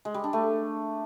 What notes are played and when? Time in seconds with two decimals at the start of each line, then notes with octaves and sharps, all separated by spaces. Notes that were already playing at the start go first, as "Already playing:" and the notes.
0.05 G#3
0.14 G3
0.24 D4
0.33 A3